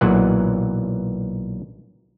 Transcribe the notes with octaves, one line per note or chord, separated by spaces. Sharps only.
B1 A#2 E3 F#3 F#5